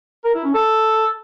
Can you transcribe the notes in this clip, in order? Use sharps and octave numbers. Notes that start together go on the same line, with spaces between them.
A#4
E4
C#4
A4